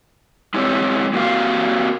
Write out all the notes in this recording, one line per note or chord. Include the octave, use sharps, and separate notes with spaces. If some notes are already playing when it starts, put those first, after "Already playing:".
G#3 C4 D#4 E4 G4 C#5
A#3 C4 F#4 G4 A#4 F5